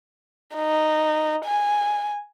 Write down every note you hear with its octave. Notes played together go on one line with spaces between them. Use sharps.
D#4
G#5